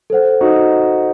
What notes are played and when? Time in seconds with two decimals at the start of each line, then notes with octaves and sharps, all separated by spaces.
0.10 A4 C5 F#5
0.41 D#4 F#4